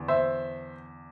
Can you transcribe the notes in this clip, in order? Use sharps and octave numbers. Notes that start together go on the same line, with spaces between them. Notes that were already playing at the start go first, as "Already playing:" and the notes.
Already playing: E2 D3
C5 E5